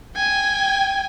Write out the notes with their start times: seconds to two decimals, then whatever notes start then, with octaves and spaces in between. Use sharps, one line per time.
0.15 G5 G#5